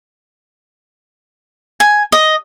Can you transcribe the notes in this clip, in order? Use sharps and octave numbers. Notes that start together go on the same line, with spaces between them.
G#5
D#5